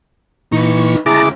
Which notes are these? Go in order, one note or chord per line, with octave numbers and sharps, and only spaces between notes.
A#2 E3 D#4 B4 C#6
D2 C#3 E4 G#4 A5 A#5 D6